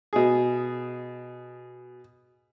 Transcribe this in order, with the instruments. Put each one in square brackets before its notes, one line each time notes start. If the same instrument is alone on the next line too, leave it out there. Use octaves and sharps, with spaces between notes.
[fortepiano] B2 G#4